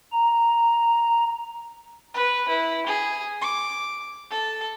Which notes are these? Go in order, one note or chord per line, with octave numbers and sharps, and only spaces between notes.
A#5
B4
E4
G#4
D6
A4